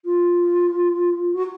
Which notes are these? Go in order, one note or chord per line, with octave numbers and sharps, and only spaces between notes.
F4
F#4